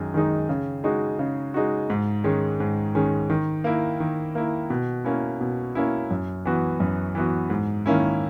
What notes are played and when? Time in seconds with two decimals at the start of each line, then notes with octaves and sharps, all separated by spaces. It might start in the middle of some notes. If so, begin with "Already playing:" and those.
Already playing: F#2 D#3 G#3 D#4
0.14 D#3 G#3 D#4
0.49 C#3
0.84 G#3 D#4 F#4
1.19 C#3
1.54 G#3 D#4 F#4
1.90 G#2
2.24 D#3 G#3 C#4
2.60 G#2
2.95 D#3 G#3 C#4
3.30 D#3
3.64 A#3 E4
4.00 D#3
4.35 A#3 E4
4.70 B2
5.04 A#3 C#4 E4
5.41 B2
5.75 A#3 C#4 E4
6.11 F#2
6.45 E3 B3 F#4
6.80 F#2
7.15 E3 B3 F#4
7.50 G#2
7.86 D#3 A#3 C#4 E4